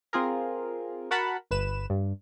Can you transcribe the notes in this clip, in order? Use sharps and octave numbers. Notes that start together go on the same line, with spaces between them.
C4 F4 G#4 A#4
F#4 A#4 F#5 A5 B5
G1 B4 E7
G2